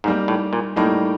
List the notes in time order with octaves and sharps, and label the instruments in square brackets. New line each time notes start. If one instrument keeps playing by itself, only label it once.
[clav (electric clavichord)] G#2 [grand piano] G3 A#3 D#4
[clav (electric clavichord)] A2
A#2
[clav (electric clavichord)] A2 [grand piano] G3 A#3 D#4